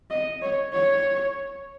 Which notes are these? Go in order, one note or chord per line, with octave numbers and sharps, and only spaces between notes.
D#5
C#5
C#5